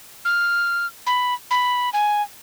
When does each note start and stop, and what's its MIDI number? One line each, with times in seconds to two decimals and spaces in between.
0.25 0.86 89
1.07 1.34 83
1.51 1.90 83
1.93 2.22 80